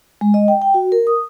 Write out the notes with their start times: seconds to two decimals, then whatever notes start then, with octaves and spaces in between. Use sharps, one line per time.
0.21 G#3
0.34 D#5
0.48 G5
0.62 G5
0.74 F#4
0.92 A#4
1.07 D#6